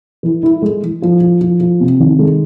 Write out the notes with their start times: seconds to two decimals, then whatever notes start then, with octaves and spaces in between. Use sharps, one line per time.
0.23 E3
0.43 E4
0.62 G#3
0.83 E3
1.02 F3
1.21 F3
1.41 F3
1.61 F3
1.80 C3
2.00 D#3
2.19 G#3